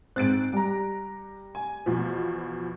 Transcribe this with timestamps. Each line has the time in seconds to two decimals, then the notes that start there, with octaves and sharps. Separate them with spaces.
0.16 G#2 C4 F#6 A6 D7
0.53 G3 A#5
1.55 G#5
1.86 E2 B2 F3